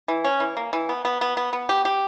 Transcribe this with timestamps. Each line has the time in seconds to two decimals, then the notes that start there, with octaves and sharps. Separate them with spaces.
0.08 E3
0.24 C#4
0.40 E3
0.57 A#3
0.73 E3
0.89 B3
1.05 B3
1.21 B3
1.37 B3
1.53 B3
1.69 G4
1.85 G4